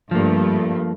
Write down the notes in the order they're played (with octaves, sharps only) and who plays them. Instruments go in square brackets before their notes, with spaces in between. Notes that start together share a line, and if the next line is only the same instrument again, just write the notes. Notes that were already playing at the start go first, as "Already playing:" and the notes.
[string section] G2 A3 [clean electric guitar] F3 A#3